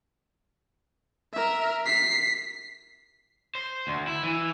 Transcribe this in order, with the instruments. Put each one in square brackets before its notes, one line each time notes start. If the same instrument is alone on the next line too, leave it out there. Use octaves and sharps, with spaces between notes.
[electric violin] A#4 E5
B6 C7
[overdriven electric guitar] C5
D2
E4
E3